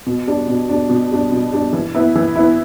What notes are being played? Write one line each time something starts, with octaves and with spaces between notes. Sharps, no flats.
B2
G3 D4
B2
G3 D4
B2
G3 D4
B2
G3 D4
E3
B3 E4
E3
B3 E4